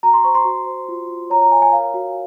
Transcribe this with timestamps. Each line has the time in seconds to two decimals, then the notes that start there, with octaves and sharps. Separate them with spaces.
0.03 F#4 A#5
0.14 C6
0.24 C5 C#6
0.35 C6
0.45 F#4
0.66 C5
0.89 F4
1.09 F4
1.30 C#5 A#5
1.42 A#5
1.51 C#5 G#5
1.62 G#5
1.73 A#4 F5
1.94 F#4